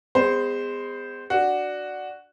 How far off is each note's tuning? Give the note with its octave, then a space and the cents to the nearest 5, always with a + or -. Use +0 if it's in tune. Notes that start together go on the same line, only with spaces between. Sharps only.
G#3 -25 B3 +30 C5 +0
D4 +0 F#4 +0